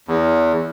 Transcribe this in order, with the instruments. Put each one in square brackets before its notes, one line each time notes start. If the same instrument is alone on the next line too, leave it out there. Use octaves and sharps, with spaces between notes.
[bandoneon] E2